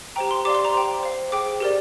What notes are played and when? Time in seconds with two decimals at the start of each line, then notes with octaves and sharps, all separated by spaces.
0.16 G4 C5 G5 A#5
0.31 C6
0.45 G4 D5 F5 D6
0.55 C6
0.65 A#5
0.74 C5 G5
1.03 C5 F5
1.32 G#4 C5 G5 D6
1.60 G4 A#4 D5